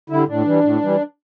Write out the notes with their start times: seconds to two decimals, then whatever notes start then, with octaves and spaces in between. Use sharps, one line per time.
0.10 D3 G3 E4
0.28 A2 D4
0.45 E3 G3
0.63 A2
0.81 E3 G3